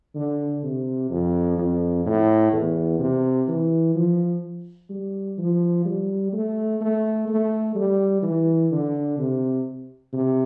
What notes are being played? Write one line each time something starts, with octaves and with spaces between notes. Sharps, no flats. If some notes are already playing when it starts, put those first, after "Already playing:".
D3
C3
F2
F2
A2
E2
C3
E3
F3
G3
F3
G3
A3
A3
A3
G3
E3
D3
C3
C3